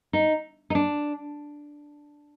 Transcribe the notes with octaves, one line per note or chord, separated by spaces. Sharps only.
D#4
D#4
D4